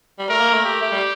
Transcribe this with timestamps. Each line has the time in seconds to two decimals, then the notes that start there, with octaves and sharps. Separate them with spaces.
0.19 G3
0.29 A3 A#4
0.41 A#3
0.53 A3
0.65 G4
0.82 A3
0.92 G3